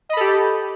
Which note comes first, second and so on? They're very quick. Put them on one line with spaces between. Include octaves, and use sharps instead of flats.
D#5 B5 A4 G4